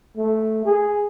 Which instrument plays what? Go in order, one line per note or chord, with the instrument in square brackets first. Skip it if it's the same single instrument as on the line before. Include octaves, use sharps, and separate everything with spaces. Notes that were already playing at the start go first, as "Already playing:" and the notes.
[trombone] A3
G#4